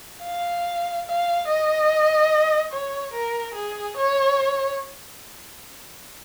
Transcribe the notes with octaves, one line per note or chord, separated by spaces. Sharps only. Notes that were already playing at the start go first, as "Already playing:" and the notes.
F5
F5
D#5
C#5
A#4
G#4
C#5